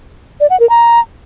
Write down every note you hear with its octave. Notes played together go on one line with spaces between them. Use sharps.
D5
F#5
A#4
A#5